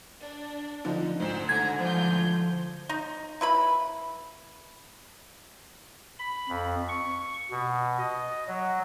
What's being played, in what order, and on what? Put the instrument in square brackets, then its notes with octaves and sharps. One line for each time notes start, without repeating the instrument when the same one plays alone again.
[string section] D4
[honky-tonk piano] D3 F3 D#4
[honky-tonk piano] D2 G#2 [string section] C5 E6
[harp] D3 [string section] G#5 A#5 [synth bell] G#6
[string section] E3 F4 G6 [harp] F3
[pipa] D#4
E4 B4 B5
[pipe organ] B5
F2
C#6
B2
D#5
F#3